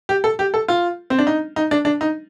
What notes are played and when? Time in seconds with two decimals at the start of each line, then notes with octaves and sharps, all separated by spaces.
0.09 G4
0.24 A4
0.39 G4
0.54 A4
0.68 F4
1.10 C4
1.19 D4
1.27 D#4
1.56 D#4
1.71 D4
1.85 D4
2.01 D#4